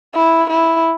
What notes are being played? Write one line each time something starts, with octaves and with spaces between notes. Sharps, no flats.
E4
E4